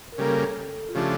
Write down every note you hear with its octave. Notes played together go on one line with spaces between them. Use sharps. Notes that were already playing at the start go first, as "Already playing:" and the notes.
A#4
C#3 G3 A#3 A4
F4
C#3 F3 A3 D4 G4